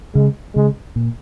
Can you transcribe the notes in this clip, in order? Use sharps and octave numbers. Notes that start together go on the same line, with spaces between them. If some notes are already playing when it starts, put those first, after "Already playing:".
C#3 G#3
C#3 G#3
A#2